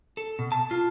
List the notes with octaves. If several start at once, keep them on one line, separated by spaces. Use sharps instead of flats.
A4
B2
A5
F4